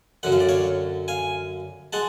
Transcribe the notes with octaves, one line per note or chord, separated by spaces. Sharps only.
F#2 D3 F#3 F#5
F5
D5
C#5 F5
F5 G#5
G#3 F#5 A5